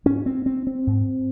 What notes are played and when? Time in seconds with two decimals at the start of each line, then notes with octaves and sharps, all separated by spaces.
0.05 G#2 C#4
0.26 C4
0.46 C4
0.67 C4
0.87 G#2